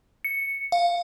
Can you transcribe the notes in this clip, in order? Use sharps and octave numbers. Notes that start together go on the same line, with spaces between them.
C#7
F5